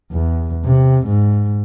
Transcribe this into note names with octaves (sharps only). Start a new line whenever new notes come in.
E2
C3
G#2